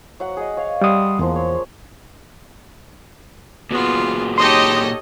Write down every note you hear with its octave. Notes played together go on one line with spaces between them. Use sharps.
F#3 F#5
G#4 D#5
C#5 F5
G3 F#5 C6 D#6
E2 F3 G#3 A#3
C#5
A#2 B3 F4 F#4 G#4
D#4 G4 A4 C#5 D#5 C6 D#6